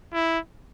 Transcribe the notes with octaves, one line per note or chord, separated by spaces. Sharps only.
E4